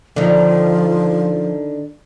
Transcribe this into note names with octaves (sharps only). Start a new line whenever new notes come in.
D3 D#3 F3